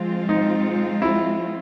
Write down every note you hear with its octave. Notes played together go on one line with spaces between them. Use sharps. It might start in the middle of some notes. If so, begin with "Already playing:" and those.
Already playing: F3 G#3 C4 F4
D#4
E4